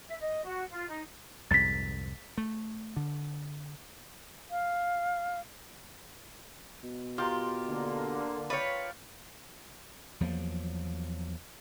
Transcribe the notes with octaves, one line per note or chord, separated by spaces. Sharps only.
E5
D#5
F#4
F4
D#4
C2 F2 G#2 A6 B6
A3
D3
F5
B2
F4 G4 A#4 C6
D3 A#3
B4 C#5 D5 F5 G5
E2 F3 F#3 A#3